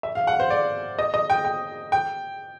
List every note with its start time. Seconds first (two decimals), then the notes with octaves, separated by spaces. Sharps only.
0.03 E5
0.15 F5
0.27 F#5
0.40 C5
0.50 D5
0.99 D#5
1.14 D#5
1.30 G5
1.45 G5
1.92 G5